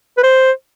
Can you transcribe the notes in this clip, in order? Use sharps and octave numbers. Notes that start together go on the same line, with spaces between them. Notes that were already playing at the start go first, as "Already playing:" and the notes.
B4
C5